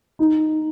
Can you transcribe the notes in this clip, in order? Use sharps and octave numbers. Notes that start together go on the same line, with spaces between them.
D#4